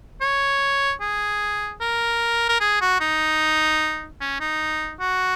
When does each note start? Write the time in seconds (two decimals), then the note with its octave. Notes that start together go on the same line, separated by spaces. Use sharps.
0.21 C#5
1.01 G#4
1.81 A#4
2.49 A#4
2.61 G#4
2.81 F#4
3.00 D#4
4.20 C#4
4.40 D#4
5.00 F#4